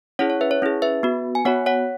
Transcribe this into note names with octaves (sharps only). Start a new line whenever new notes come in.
C#4 E4 G#4 C#5 F#5
C#5
B4 E5
C#5
C#4 E4 G#4
B4 E5
B3 F#4
G#5
B3 F#4 C#5 F#5
C#5 F#5